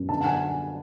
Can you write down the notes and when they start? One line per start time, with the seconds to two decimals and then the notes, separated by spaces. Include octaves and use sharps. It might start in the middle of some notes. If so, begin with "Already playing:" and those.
Already playing: F#2
0.09 D3 A5
0.21 F#5
0.26 G#5